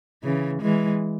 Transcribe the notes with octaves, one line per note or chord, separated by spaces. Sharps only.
C#3 E3
E3 G#3